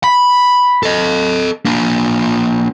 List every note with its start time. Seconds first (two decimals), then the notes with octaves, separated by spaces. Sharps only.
0.04 B5
0.83 A4 D#5
1.65 A#3 D4